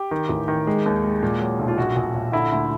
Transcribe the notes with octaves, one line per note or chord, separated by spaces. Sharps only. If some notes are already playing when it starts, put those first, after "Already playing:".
Already playing: G4
D#3
A1
D#3
G#3
D#2
G#3
A#2
F#3
B1
F4
A#1 F#4
A#1
A#1
D3 E4
D2